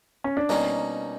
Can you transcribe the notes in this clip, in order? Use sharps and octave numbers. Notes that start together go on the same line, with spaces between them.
C#4
D4
B2 G3 A#3 C#4 D#4